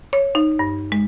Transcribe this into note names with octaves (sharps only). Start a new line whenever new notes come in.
C#5
D#4
G2
G#3